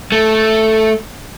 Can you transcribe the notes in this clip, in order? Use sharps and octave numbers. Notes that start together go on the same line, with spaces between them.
A3